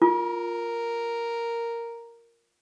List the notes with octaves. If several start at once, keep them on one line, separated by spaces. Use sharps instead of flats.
F4 A#4